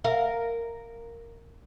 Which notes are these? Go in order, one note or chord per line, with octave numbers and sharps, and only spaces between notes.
A#4 F5